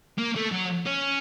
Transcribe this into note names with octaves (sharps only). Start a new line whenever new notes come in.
A#3
A3
F#3
C#4